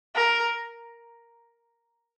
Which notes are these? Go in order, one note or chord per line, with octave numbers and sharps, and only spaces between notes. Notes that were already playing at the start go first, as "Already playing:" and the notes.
A#4